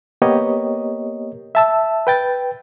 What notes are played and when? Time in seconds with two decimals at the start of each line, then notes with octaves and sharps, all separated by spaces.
0.22 A#3 B3 G4 A#4 C#5 D#5
1.55 E5 A5 E6
2.07 B4 G5 A6